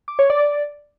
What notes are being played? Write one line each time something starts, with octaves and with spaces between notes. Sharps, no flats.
D6
C#5
D5